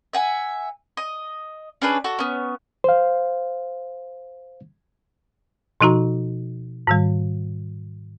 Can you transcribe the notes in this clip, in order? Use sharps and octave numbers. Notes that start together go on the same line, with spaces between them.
E5 F#5 G#5
D#5
C#4 D4 G#4 B4
F#4 A4
B3 C#4
C5 F5
B2 F3 D#4 F#4 A#5
G#2 D#3 G3